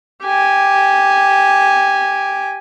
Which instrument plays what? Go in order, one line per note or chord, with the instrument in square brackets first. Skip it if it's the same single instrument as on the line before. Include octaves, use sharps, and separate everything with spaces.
[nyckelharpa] G4 G#5